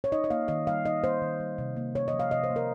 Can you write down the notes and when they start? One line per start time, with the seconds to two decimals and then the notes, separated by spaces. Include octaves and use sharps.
0.04 C#5
0.12 D#4 D#5
0.24 D#5
0.30 A#3 F5
0.48 D#3 D#5
0.67 G3 F5
0.85 D#4 D#5
1.03 A#3 C5
1.22 D#3
1.40 G3
1.58 C3
1.76 A#3
1.95 C3 C#5
2.08 D#5
2.13 F3
2.20 F5
2.31 C3 D#5
2.44 C5
2.50 A#3
2.56 A#4